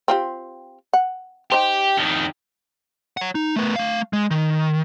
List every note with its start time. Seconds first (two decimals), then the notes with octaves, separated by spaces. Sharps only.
0.08 C4 F4 G4
0.93 F#5
1.52 D#4 G4 C5
1.98 F2 D#3
3.17 C#5 F#5
3.35 D#4
3.56 A3 B3
3.76 A3 F5
4.13 G#3
4.31 D#3